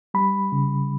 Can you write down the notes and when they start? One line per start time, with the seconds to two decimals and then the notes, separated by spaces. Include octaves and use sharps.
0.14 G3 B5
0.52 C#3